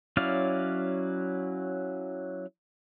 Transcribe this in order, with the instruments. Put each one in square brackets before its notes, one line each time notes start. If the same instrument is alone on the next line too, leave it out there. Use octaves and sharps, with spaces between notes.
[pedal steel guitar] F#3 C#4 E4 D5 F5